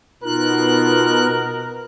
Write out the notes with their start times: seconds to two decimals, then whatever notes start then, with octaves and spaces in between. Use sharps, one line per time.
0.23 B2 D#4 F4 A#4 F#6